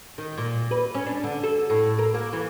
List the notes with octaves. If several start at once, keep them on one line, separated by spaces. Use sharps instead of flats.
D#3
A#2
B4
C#4
D4
D3
A4
A2
A#4
A#3
E3